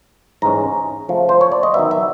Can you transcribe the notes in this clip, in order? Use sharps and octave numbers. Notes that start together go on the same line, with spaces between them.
G#2 E3 G#3 C#4 A#5
C#3 F3 A3
C5
C#5
D5
D#5
D#3 F#3 B3 E5
E5